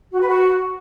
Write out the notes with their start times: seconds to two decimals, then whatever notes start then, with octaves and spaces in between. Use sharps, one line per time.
0.12 F#4
0.20 B4
0.27 F#4